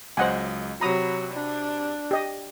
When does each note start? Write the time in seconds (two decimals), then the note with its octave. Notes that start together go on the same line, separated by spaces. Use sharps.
0.17 C#2 F#3 C5 D#5 F#5 G#5
0.81 C3 F#3 A#5 B5 D#6
1.33 D4
2.11 G4 D#5